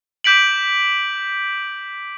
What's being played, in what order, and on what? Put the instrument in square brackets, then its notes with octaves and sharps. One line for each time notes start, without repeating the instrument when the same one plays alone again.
[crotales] D6 G6 B6 D7 F#7